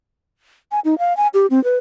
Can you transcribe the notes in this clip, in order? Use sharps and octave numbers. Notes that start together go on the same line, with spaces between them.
G#5
D#4
F5
G#5
G4
C4
B4